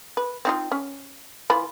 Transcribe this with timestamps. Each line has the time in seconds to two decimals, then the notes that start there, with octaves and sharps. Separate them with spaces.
0.17 B4
0.45 C4 D#4 F4
0.72 C#4
1.50 E3 F4 B5